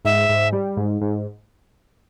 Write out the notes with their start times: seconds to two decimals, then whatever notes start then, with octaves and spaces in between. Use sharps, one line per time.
0.05 G#2 E5
0.29 G#2
0.52 G3
0.77 G#2
1.01 G#2